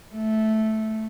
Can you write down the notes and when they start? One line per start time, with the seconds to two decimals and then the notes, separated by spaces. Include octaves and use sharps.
0.15 A3